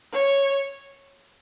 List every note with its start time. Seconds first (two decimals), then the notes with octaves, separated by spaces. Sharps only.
0.13 C#5